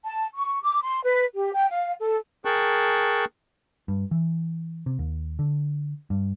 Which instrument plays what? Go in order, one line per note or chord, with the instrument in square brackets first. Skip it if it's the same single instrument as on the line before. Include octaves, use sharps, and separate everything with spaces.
[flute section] A5
C#6
D6
C6
B4
G4
G5
F5
A4
[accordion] G#4 A#4 G5 A5 C#6 F#6
[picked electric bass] G2
E3
C3
D#2
D3
G2